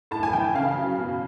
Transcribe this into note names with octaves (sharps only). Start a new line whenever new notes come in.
A2 A5
G#5
E3 G5
C#3 F5
F#3
B2